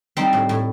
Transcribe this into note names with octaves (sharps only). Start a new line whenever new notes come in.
G3 C4 D#4
A2
A2